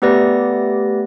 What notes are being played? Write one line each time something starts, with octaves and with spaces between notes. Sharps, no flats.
A3 B3 G4 B4 D5 A#6